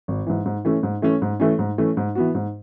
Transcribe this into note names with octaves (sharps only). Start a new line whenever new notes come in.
G#1
G#2 E3
G#2
E3 A3 C#4
G#2
E3 A3 C#4
G#2
E3 A3 C#4
G#2
E3 A3 C#4
G#2
E3 B3 F#4
G#2